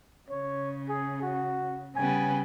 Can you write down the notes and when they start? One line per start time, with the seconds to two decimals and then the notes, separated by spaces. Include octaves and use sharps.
0.30 C#3 C#5
0.89 G#4
1.23 F#4
1.96 C#3 G3 B3 G#5